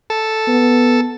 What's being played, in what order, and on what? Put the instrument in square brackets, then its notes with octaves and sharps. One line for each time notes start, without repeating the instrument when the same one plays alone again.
[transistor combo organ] A4
[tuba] B3